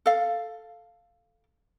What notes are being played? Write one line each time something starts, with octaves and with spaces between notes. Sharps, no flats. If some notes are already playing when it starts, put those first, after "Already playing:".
A4 F5